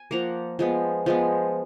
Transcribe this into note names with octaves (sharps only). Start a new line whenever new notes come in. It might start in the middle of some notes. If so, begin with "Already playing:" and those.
Already playing: G#5
F3 A#3 F#5 A#5
F3 G#3 B3
F3 G#3 B3